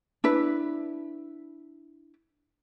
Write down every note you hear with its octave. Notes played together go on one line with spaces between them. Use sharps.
D4 E4 B4